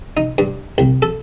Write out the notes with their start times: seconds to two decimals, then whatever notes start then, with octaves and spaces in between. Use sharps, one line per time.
0.17 D#4
0.38 G2
0.78 C2
1.02 A4